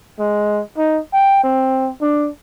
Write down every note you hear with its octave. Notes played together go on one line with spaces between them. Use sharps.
G#3
D#4
G5
C4
D4